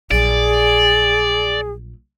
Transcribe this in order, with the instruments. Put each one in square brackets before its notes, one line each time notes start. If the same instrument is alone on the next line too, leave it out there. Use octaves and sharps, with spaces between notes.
[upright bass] A#1 F#3 [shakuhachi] G#4 [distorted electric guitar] D5